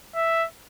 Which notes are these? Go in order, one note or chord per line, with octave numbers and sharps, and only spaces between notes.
E5